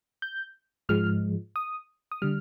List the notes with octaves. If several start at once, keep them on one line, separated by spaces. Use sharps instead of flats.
G6
G#2 F3 G#3 F6
D#6
D#6
D3 G3 F6